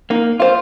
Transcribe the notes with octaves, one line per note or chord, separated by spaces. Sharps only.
A#3 D#4
F4 C5 F5